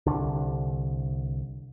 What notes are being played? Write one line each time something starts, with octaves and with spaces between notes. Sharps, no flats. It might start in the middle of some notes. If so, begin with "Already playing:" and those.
C2 D3